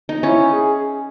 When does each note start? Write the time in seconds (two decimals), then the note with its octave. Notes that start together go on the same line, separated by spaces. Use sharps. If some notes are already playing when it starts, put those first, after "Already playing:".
0.09 D#4
0.23 C#4 E4
0.52 G#4